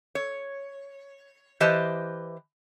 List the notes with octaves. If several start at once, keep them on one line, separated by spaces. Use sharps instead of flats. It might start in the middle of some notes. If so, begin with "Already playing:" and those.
C#5
E3 G4 B4 C5 D#5 A5